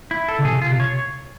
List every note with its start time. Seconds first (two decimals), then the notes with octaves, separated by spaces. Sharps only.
0.11 E4
0.28 A4
0.39 C#3
0.45 C3 G#4
0.62 F4
0.71 C3
0.80 C#5